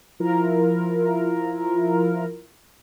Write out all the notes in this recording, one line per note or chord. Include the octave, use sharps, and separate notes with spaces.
F3 E4 F4 A#4